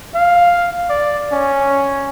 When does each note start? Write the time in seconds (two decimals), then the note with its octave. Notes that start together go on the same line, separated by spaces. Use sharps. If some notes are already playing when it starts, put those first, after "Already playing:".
0.15 F5
0.90 D5
1.32 C#4